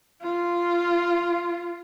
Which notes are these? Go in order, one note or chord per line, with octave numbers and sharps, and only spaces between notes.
F4